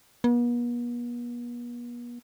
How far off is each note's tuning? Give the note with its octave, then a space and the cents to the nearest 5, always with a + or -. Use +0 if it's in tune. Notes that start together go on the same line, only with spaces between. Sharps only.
B3 -45